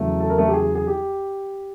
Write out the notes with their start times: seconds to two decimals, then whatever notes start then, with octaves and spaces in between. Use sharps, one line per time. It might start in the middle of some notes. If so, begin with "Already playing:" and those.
Already playing: E2 C#3 F#3 A3
0.20 A4
0.30 A#4
0.38 A3 A4
0.48 G4
0.54 G#4
0.75 G#4
0.87 G4